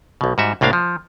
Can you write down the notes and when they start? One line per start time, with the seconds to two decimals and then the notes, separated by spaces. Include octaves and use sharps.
0.21 B1 B2
0.38 G#2 G3 F#4 E5
0.61 C2 A2 A#3 D4 F5
0.73 F3